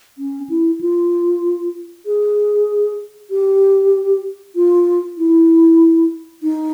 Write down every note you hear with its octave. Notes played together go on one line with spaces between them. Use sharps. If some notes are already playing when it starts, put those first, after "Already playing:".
C#4
E4
F4
G#4
G4
F4
E4
D#4